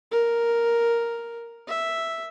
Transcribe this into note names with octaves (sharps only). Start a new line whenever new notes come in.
A#4
E5